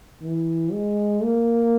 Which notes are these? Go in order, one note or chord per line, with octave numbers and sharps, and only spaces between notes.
E3
G#3
A#3